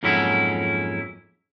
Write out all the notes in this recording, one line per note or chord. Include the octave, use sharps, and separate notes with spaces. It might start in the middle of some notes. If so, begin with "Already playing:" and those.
F2 G#2 F#3 A#3 C#4 E4